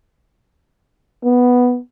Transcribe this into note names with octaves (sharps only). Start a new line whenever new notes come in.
B3